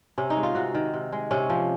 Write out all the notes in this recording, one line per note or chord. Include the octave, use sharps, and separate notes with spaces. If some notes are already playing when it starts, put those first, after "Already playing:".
C3 C#4
D#4
G#3
F4
C3 F#4
D#3
C3
G#3
C3 C#4
F3